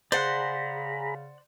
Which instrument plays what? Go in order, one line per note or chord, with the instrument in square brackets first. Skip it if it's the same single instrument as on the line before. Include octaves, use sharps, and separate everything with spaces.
[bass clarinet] C#3 [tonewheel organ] G#4 A#5 B5 [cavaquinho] C5 [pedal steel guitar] D5 F#5 F#6